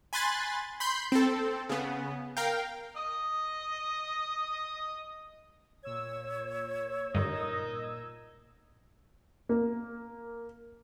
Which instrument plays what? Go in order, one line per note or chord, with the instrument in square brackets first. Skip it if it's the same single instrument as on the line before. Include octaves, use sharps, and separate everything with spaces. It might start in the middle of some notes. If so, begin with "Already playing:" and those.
[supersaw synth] G#5 B5 C6 F#6 A6
B5 C6 G6
C4 A4
C#3 B3
A#4 F5 G5
[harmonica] D#5 D#6
[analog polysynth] A#2 E6 G#6 [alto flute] C#5
[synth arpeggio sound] G2 D3 [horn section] D#4 A#4 D#5
[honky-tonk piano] A#3